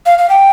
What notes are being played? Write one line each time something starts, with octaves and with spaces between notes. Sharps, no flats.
F5
F5
G5